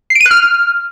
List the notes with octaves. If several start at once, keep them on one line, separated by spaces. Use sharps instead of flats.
C7
D7
D#7
F#6
F6